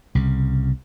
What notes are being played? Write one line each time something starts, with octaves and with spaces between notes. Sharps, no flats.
C2 C#3